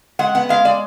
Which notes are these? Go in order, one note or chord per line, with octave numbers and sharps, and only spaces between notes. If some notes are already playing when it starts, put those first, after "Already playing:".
G#3 F#5
B3 F#5
G#3 F5
G#3 D5